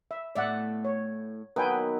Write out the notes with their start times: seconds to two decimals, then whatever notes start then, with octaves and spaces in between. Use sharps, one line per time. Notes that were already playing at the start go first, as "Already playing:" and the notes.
0.11 E5
0.35 A2 A3 B3 D5 E5 F#5
0.85 C#5
1.56 D#3 F#3 B3 B4 G5 G#5